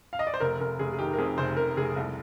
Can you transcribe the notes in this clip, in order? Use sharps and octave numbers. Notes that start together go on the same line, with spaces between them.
F5
D#5
D5
C5
F1 A#4
F1 A#4
F1 G#4
G#4
D#3 G4
A#4
F2 G#4
F1 C5
F1 A#4
F1 G#4
C2